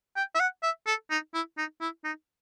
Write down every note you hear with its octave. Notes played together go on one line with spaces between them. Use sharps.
G5
E5
F#5
E5
A4
D#4
E4
D#4
E4
D#4